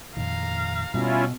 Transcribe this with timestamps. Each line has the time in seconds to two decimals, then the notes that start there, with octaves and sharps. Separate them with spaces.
0.17 F2 A#2 D#3 F5 A#5
0.94 B2 G3 C#4 E4 F4